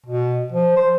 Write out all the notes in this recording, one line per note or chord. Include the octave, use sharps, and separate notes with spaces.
B2
F3
C5